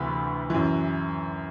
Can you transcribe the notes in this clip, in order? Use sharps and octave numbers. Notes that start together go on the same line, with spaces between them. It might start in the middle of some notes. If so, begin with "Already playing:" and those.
Already playing: D2 C3 E3 B4
F#2 E3